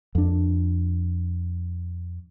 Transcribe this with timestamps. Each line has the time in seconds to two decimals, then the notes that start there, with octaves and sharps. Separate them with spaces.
0.15 F2 D4